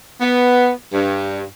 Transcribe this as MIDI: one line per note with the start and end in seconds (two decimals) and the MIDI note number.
0.21 0.71 59
0.93 1.43 43